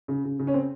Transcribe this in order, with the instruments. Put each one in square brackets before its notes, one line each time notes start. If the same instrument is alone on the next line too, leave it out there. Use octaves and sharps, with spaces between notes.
[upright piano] C#3
C#3
C#3
C#4
C4